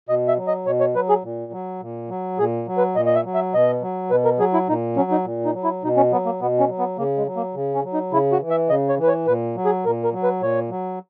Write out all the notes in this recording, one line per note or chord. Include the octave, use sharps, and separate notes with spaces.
B2 D#5
E5
F#3
D#5
B2 C#5
C#5
F#3 B4
G#4
A#2
F#3
A#2
F#3
A#2 G#4
F#3
B4
A#2 D#5
D#5
E5
F#3
E5
B2 D#5
F#3
B2 B4
A#4
F#3 G#4
E4
A#2 D#4
F#3 C#4
D#4
A#2
D#4
F#3
E4
B2 D#4
C#4
F#3 B3
A#3
B2 B3
C#4
F#3
B3
C#3 A#3
G#3
F#3
A#3
C#3
C#4
F#3
D#4
C#3 E4
F#4
E3
E5
C#3 D#5
C#5
E3 B4
C#5
A#2 B4
F#3
G#4
A#2 A#4
A#4
F#3
B4
A#2 C#5
F#3